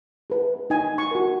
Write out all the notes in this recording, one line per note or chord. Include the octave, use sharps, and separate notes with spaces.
G#4 B4
D#4 G#5
C#6
F#4 A#4